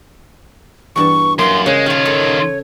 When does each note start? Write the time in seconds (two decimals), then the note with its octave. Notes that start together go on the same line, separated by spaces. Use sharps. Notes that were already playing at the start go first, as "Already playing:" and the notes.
0.96 E2 G2 A5 C#6
1.39 F#2 A#3 C6
1.66 C#3 G#3 C#5
1.86 D#3 F4 F5 A5
2.05 A4